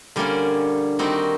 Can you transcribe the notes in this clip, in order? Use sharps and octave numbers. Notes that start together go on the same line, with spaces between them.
D3 G3 A#3 C#4
D#3 G3 C4 D#4 F#4